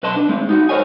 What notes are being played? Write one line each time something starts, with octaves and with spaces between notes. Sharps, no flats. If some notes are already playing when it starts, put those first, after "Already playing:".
B1 B4 D#5 A5 C6
D4
G#3 C4
D#4 F4 F#4
A#4 C5 C#5 D#5 G#5